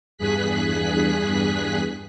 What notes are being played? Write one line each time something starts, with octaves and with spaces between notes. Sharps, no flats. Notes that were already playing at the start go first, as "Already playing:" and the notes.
E2 G2 G#4 F#6 B6